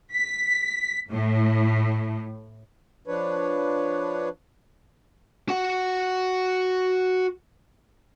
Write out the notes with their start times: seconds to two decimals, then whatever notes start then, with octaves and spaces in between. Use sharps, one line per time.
0.12 B6
1.10 A2
3.07 F3 D4 B4 C#5
5.49 F#4 F#5